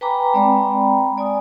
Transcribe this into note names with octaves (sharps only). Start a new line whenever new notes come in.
B4 G5 G#5 A#5 B5 D6
G#3 C4 D5 G5 A#5 B5
D5 G#5 D#6